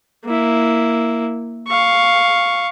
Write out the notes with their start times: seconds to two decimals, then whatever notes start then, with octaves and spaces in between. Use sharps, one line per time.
0.25 A#3 E4
1.67 F5 C#6